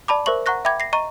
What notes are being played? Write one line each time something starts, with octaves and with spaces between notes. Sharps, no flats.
D5 A5 B5 D6
A#4 C5 E5 C#6 F#7
F#5 A#5 C#6 F#6 A#6
E5 G5 B5 D6 G#6
A#6 C7
D#5 A#5 C#6 D#7